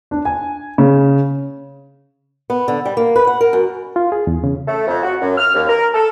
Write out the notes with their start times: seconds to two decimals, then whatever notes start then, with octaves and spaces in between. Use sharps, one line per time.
0.11 D4
0.25 G#5
0.78 C#3
2.50 B3
2.68 D3
2.85 G3
2.97 A#3
3.16 B4
3.27 F#5
3.41 A#4
3.53 F#2
3.96 F4
4.12 G#4
4.27 E2
4.44 C#3
4.68 A3
4.87 F2
5.03 F#4
5.22 F#2
5.38 F6
5.55 D#2
5.69 A#4
5.94 A4